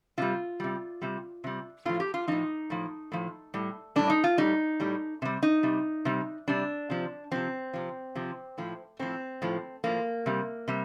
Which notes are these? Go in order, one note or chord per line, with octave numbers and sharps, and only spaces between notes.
C3 G3 F4
C3 G3
C3 G3
C3 G3
A2 F3 F4
G4
F4
A2 F3 D#4
A2 F3
A2 F3
A2 G3
A2 G3 D4
D#4
F4
A2 G3 D#4
A2 G3
C3 G3
D#4
C3 G3
C3 G3
C3 G3 D4
C3 F3
C3 F3 C4
C3 F3
C3 F3
A2 F3
A2 F3 C4
A2 F3
A2 F3 A#3
C3 G3
C3 G3